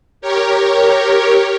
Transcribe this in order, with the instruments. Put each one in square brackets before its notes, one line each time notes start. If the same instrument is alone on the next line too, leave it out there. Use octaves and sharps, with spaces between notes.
[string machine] G4 A#4 C#5